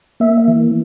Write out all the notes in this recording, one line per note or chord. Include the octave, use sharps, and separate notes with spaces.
A#3 E5
E3